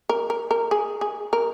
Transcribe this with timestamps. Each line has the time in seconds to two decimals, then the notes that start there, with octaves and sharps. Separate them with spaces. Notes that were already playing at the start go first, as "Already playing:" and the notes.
0.09 A#4
0.30 A#4
0.51 A#4
0.71 G#4
1.01 G#4
1.33 A#4